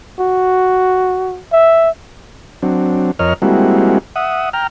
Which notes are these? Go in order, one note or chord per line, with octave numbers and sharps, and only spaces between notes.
F#4
E5
F#3 C4 D4
F2 A#4 C#5 D#5 F6
G3 G#3 A#3 C4 E4 F#4
E5 F#5 D#6
G5 A#5 F6